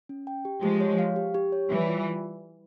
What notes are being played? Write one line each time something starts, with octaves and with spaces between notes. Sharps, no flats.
C#4
G5
G4
F3 G#3 G4
C#5
F5
G4
G4
C#5
E3 G3 E5
F4